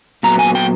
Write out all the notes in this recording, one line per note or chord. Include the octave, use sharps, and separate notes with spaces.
A#2 F#3 B3 A#5
G#5
G5